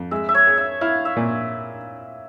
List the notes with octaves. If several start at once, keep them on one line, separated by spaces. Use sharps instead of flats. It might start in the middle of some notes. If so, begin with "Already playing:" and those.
Already playing: F2
G#3 E5
E5
C#5
G#4
E5
E4 F5
E5
A#2